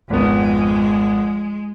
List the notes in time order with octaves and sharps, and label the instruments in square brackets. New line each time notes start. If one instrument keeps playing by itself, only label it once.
[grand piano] G#1 B3 [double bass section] F2 [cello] G#3